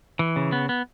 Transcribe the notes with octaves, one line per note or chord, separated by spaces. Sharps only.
E3
C#3
B3
B3